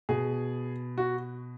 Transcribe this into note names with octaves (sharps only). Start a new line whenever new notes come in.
B2 G#4
F#4